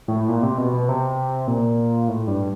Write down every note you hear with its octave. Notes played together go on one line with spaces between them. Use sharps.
A2
A#2
C3
B2
B2
C3
A#2
A2
G2